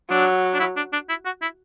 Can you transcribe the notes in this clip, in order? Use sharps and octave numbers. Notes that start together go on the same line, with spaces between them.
F#3 D4
D4
E4
D4
D4
E4
F#4
E4